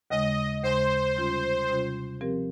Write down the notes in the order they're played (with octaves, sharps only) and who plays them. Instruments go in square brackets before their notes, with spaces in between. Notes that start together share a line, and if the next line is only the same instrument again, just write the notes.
[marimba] D#2 C#3 G#3 [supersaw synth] D#5
[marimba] D#2 C#3 G#3 [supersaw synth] C5
[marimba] C3 G3 C#4 F4
C3 G3 C#4 F4
F3 C4 G4 A#4